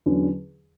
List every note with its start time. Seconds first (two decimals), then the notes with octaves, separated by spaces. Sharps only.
0.06 E2 D3 F#3 C#4